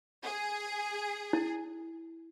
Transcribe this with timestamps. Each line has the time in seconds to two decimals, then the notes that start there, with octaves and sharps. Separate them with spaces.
0.24 G#4
1.33 E4